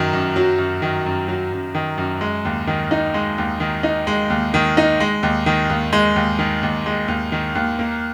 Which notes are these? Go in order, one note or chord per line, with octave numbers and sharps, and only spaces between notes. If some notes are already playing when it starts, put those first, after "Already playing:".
Already playing: F#2 D#3 F#3
F#2
F#3
F#2
D#3
F#2
F#3
F#2
D#3
F#2
G#3
D#2
D#3
D#4
G#3
D#2
D#3
D#4
G#3
D#2
D#3
D#4
G#3
D#2
D#3
D#2
G#3
D#2
D#3
D#2
G#3
D#2
D#3
D#2
A#3